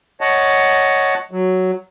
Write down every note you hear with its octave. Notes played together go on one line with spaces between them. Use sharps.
C#5 D#5 F#5 A5
F#3